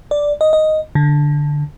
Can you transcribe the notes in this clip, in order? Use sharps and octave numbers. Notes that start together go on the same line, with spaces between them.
D5
D#5
D#5
D3